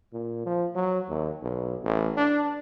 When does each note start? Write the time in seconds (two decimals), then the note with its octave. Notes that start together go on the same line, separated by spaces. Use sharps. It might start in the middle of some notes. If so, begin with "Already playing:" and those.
0.13 A#2
0.46 F3
0.75 F#3
1.09 D#2
1.43 B1
1.83 A1
2.17 D4